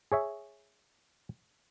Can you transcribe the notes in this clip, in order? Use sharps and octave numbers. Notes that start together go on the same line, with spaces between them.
G#4 C#5 E5